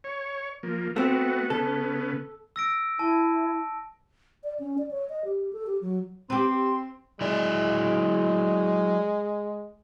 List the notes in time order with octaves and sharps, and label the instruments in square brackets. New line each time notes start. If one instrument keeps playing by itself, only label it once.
[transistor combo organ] C#5
F3 A#3
[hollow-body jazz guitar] A3 C4 [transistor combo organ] B3 F#4
[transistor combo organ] C#3 B3 [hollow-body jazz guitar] A4
[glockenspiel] E6 A#6 D7
[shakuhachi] E4 [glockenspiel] A5
[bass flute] D5
C#4
D5
C#5
D#5
G4
A4
G4
F#3
[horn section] C4 [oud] G4 B4 [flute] C6
[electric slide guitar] F#3 E4 D5 [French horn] G#3